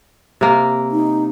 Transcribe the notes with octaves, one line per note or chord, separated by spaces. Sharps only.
C3 A#3
D#4